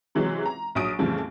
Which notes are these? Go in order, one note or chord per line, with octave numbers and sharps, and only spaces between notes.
C3 E3 F#3 G#3
A#5
A#1 F#3 D#6 D7
F2 A2 C#3 E3 F3 G3